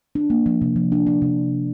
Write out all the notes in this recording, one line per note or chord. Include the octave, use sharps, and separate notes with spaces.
D4
A#3
F3
C3
F3
D4
D4
C3